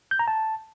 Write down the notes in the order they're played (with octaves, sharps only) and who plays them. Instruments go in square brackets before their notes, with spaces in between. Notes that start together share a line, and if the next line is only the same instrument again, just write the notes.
[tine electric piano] G6
A#5
A5